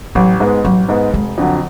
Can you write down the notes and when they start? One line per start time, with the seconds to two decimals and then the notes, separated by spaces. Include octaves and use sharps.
0.15 A1 F#3
0.40 G#2 G#3 B3
0.64 A1 F#3
0.89 G#2 G#3 B3
1.13 F1 G#3
1.38 F2 D3 F#3